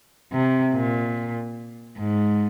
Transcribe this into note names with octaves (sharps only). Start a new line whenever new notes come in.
C3
A#2
G#2